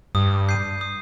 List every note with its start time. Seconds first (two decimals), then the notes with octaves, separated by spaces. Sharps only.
0.15 G2 D#6
0.49 G6 C7 D#7
0.81 D#6